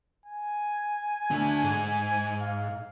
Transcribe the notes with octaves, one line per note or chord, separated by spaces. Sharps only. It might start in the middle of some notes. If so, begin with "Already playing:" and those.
G#5
D3 A3
G#2
F5